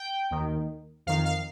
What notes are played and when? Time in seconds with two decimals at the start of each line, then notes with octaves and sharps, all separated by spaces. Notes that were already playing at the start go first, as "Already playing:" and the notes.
Already playing: G5
0.31 D#2 D#3
1.06 F2 D#3 F5
1.25 F5